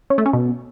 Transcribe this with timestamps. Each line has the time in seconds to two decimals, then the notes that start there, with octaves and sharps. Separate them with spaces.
0.10 C#4
0.18 A3
0.26 C#4
0.33 B2